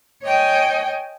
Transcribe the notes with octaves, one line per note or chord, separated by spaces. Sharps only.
C#5 D#5 G5 G#5